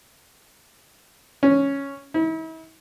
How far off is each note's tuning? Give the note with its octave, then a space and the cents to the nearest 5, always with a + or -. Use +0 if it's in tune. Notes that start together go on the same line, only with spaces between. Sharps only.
C#4 +0
E4 -40